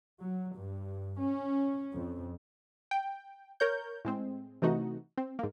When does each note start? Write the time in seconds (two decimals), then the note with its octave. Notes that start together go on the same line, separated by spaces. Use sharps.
0.20 F#3
0.56 G2
1.19 C#4
1.93 F2
2.91 G5
3.60 A#4 C#5 G6
4.05 A2 G#3 C4
4.62 C3 E3 A3 D#4 F#4
5.18 C4
5.39 G#2 A#3